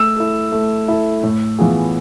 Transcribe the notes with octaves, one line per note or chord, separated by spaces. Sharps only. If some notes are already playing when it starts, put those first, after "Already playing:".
Already playing: A3 E6
E4 A4
A3
E4 A4
A2
E3 B3 F4 G#4